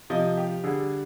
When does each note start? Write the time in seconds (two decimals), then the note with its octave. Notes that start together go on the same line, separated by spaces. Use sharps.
0.10 C3 F3 D#5
0.37 G4
0.64 D3 G3 G#4